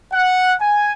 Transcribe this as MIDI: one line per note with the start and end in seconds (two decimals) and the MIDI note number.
0.13 0.54 78
0.60 0.92 80